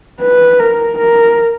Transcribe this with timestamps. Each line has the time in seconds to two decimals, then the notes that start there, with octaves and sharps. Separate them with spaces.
0.21 B4
0.59 A#4
0.98 A#4